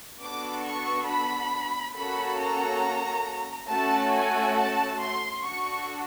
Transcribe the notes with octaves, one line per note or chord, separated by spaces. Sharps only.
B3 D4 F#4 A4 D6
C#6
B5
A#3 C#4 F#4 A4 B5
A#5
A3 C#4 F#4 A4 A5
G#5
A5
C6
D4 F#4 A4 C#6